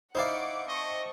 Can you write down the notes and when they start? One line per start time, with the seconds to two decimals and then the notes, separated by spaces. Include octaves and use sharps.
0.15 D#4 E4 C5 D5 F5 F#5 C#6 D6
0.69 C4 D#5 A5 C#6